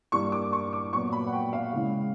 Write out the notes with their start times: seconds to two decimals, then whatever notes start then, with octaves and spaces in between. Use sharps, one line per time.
0.12 G2 E3 G3 A#3 C#6
0.32 D6
0.53 C#6
0.73 D6
0.93 A#2 F#3 B3 C#6
1.12 B5
1.27 F#5
1.33 G5
1.53 F5
1.73 C#3 E3 G#3